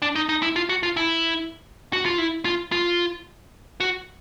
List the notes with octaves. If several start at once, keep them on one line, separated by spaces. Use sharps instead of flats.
D4
D#4
D#4
E4
F4
F#4
F4
E4
F#4
F4
E4
F4
F4
F#4